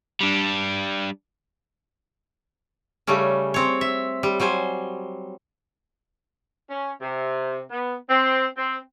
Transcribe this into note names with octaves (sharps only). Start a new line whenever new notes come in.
G3 D4
C#3 G3 A3 C#4
C4 C#5
E5
G3
F#3 G3 C5 G#5
C#4
C3
B3
C4
C4